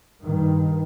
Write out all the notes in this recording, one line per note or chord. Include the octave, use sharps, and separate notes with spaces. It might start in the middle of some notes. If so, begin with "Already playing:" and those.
G2 D#3